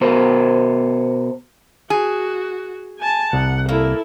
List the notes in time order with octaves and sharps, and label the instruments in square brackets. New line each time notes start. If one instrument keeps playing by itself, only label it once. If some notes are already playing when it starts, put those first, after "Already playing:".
[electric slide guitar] B2 B3 F#4 A#4 C5
[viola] F#4 [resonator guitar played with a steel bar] G#4
[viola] G#5 A5
[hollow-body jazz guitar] C2 [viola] F#5
[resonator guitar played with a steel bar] A#3 [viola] E4 A4